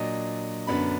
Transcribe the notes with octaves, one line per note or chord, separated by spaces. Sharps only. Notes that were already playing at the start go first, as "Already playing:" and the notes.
Already playing: A#2 F#3 D4 D#5
F#2 D3 F#3 B3 D4 B5